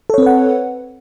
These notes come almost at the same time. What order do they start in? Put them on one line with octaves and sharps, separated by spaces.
A4 C#5 C4 B4 F#5